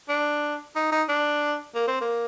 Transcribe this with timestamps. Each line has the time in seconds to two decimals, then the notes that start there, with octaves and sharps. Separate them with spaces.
0.09 D4
0.75 D#4
0.92 D#4
1.09 D4
1.75 A#3
1.87 C4
2.01 A#3